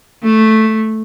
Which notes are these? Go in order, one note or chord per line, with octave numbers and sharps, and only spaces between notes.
A3